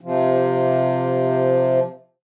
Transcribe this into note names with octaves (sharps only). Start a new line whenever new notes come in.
C3 F3